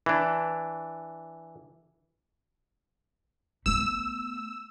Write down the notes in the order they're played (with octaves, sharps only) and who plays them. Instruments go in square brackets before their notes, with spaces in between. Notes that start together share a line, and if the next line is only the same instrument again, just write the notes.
[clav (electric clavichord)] E3 D4
[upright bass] A3 B3 [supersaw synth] E6